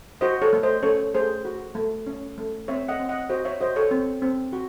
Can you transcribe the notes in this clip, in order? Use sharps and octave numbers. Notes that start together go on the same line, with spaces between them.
F#4 C5 D#5
A4 C#5
A3
C5 D#5
C#4 A4 C#5
A3 G#4 C5
F#4
A3
C#4
A3
C4 C#5 E5
D#5 F#5
C4
D#5 F#5
F#4 C5 D#5
C#5 E5
F#4 C5 D#5
A4 C#5
C4
C4
F#4